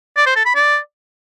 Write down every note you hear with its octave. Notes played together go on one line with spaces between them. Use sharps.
D5
C5
A4
B5
D5